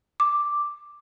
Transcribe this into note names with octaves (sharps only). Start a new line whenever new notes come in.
D6